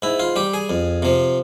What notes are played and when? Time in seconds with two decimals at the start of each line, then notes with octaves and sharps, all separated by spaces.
0.02 G#2 E4
0.20 F4
0.36 G3 G4
0.54 G#4
0.70 F2
1.02 C3 F3